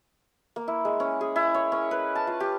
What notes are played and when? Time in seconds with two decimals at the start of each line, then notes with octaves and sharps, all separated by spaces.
0.56 A#3
0.68 E4
0.85 G#3
1.00 C#4
1.21 G#4
1.36 E4
1.54 C#5
1.72 C#4
1.91 B4
2.16 A5
2.27 F4
2.40 G4